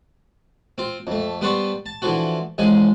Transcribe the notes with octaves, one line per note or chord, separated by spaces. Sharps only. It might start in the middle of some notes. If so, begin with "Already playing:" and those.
C4 F4
F2 A3
G3 B3 B4 C5 A5 C#6
A5
D3 E3 F3 F4 F#4
A1 F3 G#3 G#5